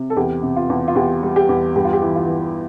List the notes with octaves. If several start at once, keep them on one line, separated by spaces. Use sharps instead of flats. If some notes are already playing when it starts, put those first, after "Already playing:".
Already playing: C3
A4
E2 G4
C3
F4
E2
F4
E2 G4
G3
G4
E2
G2 G4
F4
G4
E3
F4
E3